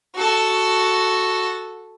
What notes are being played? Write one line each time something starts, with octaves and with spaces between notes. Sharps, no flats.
F#4 A4